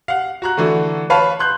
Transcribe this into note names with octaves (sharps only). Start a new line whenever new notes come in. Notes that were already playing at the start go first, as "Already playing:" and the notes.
F5 F#5
F#4 A#5 F#6
D3 E3 A3 F#4
B4 C#5 F5 A5 B5
C6 F#6 G6